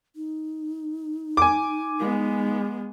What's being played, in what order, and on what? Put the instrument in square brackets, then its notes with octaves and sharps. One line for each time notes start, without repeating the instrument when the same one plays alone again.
[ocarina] D#4
[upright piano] G#5 D6
[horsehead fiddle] G#3 B3